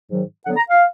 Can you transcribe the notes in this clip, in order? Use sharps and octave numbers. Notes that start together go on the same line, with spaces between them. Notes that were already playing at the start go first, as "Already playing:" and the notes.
G#2 D#3 F#3
D3 F#3 B3 F#5
A#5
F5